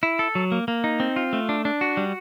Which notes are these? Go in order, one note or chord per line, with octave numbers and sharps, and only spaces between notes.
E4
A4
F#3
A#3
A#3
D#4
C4
F4
A3
D4
D4
F#4
G3